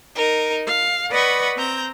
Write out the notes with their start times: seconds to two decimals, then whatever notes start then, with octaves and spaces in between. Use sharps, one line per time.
0.15 D#4 A#4
0.66 F5
1.11 B4 D5 D#5 F#5 B5 C#6
1.56 C4 A#5 G6